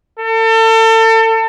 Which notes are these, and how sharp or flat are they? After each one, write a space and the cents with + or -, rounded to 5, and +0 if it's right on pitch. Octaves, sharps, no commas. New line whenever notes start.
A4 +35